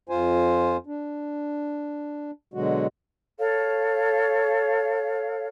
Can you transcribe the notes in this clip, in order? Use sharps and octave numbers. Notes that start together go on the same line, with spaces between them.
F2 F4 C5 G#5
D4
B2 D3 F#3 G#3 F#4
A4 C#5 F5